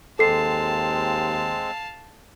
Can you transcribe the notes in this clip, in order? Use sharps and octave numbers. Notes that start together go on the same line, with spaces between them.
D#2 G#3 C4 A4 F5 A5 C7